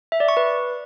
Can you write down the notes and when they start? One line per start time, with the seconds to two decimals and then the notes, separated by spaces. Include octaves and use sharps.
0.12 E5
0.20 D5
0.29 C#6
0.37 B4